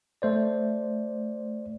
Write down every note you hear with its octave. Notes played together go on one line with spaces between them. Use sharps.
A3 C5 D5